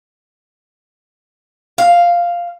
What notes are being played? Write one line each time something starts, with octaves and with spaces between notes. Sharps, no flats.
F5